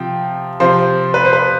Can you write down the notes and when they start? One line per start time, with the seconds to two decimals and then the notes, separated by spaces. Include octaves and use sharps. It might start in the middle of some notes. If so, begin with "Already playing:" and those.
Already playing: C3 F3 G5
0.60 C3 F3 C5
1.14 B4
1.25 C5
1.33 B4